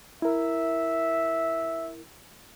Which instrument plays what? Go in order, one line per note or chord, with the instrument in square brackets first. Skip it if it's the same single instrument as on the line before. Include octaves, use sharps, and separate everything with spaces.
[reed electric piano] E4 A#4 [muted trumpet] E5